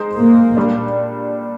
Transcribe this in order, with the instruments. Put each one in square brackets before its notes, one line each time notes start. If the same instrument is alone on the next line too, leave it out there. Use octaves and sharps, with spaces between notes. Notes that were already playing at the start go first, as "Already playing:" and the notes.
Already playing: [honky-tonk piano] G#3 D#4 G#4 C5
[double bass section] A#3
[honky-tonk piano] A#2 G3 D4